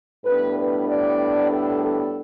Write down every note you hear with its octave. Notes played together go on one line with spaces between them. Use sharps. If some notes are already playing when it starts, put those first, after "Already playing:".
A2 G3 B3 D4 B4
B4
D5
A4
A4